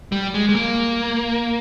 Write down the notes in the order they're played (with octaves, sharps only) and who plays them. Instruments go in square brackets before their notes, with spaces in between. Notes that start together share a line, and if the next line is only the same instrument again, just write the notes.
[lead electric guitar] G3
G#3
G#3
A#3